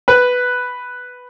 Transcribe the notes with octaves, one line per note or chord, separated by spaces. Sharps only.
B4